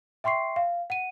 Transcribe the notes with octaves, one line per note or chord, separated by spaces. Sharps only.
E5 G5 C6 C#6 C7
F5
F#5 D#7